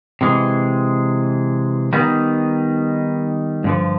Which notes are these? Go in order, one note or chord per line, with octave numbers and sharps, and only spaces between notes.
C3 E3 G#3
D#3 G3 B3 D#4
G2 D3 F3